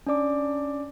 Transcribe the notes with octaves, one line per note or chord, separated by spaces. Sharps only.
C#4 D4 D5 D6